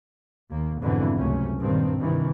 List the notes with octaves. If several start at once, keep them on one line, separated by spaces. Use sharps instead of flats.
D#2 A#3
F2 G#2 B2 D3 E3
C#2 F#2 C3 A3 C#4
G2 A#2 D#3 C4
G2 C3 D#3 E3